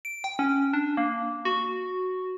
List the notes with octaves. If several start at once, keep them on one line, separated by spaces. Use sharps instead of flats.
D7
G5
C#4
D4
A#3
F#4